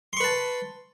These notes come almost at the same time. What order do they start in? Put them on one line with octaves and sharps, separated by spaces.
C6 C#6 B4 A5